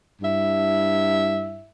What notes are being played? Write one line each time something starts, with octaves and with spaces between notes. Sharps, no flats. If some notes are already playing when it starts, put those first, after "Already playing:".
G2 E4 E5